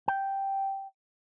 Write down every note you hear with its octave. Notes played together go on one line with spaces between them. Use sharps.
G5